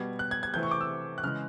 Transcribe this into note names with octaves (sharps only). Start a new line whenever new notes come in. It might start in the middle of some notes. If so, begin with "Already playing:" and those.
Already playing: B2 G3 B3 G#6
F#6
G#6
G#6
C3 E3 A3 C4 G6
C#6
D6
E6
F#6
C#3 E3 G#3 F6